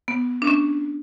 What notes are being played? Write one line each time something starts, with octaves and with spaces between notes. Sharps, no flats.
B3
D4
C#4